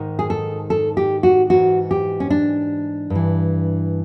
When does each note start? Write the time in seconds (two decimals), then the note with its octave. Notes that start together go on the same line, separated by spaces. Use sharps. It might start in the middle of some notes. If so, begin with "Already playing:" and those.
Already playing: G#2 D#3
0.19 G#4
0.30 A4
0.70 A4
0.97 G4
1.23 F#4
1.50 G#2 E3 F#4
1.91 G4
2.20 C#4
2.30 D4
3.10 G2 E3